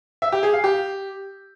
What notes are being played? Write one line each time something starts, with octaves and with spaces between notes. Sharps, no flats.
E5
G4
G#4
F5
G4